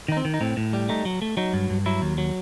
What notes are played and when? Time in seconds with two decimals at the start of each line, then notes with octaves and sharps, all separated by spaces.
0.08 D#3 D#4
0.17 C4
0.25 D#3
0.34 D#4
0.41 A2 C4
0.57 A2
0.73 G3
0.89 A3 D#4
1.05 F#3
1.22 A3
1.37 F#3 D#4
1.53 G2
1.70 G2
1.86 F#3 E4
2.02 D#2
2.18 F#3